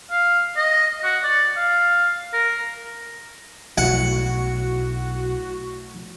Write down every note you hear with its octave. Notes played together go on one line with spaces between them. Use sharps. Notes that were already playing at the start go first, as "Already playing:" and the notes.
F5
D#5
F#4
D5
F5
A#4
B1 A2 F#3 F#4 F#5